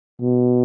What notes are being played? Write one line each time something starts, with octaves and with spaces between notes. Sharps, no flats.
B2